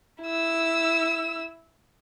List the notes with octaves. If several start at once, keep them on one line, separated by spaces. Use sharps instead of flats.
E4 E6